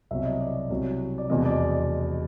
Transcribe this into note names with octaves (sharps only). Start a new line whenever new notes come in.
C2 B2 F#3 E5
D#5
D5
C2 B2 F#3
D5
F1 E2 B2 D#5
D5